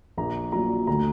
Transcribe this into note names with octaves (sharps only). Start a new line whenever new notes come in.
A#1 A#5
A#2 F#3 A#5
D2 A#5